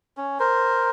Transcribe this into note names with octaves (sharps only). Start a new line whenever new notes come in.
C#4
A#4 C5